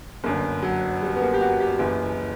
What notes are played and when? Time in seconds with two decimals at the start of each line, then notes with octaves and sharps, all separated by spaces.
0.24 G1 F#2 D3 A#3
0.62 F#3
1.02 G3
1.16 B3
1.22 A#3
1.34 G4
1.41 F#4
1.60 G4
1.79 F#1 F#2 E3